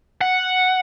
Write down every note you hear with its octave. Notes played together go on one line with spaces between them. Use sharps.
F#5